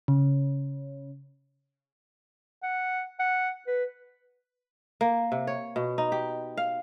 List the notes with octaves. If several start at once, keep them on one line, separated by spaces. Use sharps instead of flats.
C#3
F#5
F#5
B4
A#3
C3
C#5
B2
D#4
G4
F5